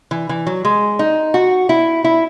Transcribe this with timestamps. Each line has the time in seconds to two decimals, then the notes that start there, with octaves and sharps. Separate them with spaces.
0.11 E3
0.29 E3
0.47 F#3
0.65 G#3
0.99 D#4
1.34 F#4
1.69 E4
2.04 E4